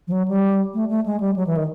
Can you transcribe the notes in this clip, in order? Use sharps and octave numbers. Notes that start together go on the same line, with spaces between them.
F3
F#3
G3
A3
A3
G#3
G3
F#3
E3
D#3